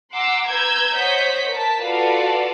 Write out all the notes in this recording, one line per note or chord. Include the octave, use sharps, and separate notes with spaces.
F#5 A#5 C6 D6 E6
B4 A#5 E6 G6 G#6
C5 C#5 D#5 F#5 G6 B6
A#4 A5 B6
F4 F#4 A4 B4 D5 F5